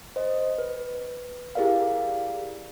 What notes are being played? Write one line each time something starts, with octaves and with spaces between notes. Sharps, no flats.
C5 D#5
B4
E4 G4 G#4 A#4 D5 F5